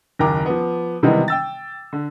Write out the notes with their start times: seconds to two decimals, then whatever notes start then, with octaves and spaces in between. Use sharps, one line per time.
0.19 F#1 D#2 A#4 G5 A#5 D6
0.46 F3 B3
1.03 C3 D#3 E3 G3 G#3 B3
1.28 G5 E6 A6
1.93 D3